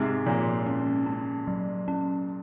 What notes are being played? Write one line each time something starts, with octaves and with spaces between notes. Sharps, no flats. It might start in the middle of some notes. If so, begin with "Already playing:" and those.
Already playing: G#2 C3 G#3
A#2 F3
C#4
C#4
F#3
C#4